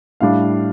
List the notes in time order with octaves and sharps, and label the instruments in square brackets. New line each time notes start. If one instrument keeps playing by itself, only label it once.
[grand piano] A2 G3 D4 F5